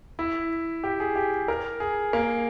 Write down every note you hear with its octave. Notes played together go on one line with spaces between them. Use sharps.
E4
G4
G#4
G4
A#4
G#4
A#3